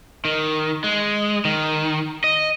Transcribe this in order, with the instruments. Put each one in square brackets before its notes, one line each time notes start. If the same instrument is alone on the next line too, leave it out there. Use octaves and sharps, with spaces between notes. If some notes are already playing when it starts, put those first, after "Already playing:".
[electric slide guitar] D#3
G#3
D#3
D#5